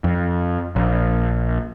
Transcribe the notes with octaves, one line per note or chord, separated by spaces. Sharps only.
F2
A#1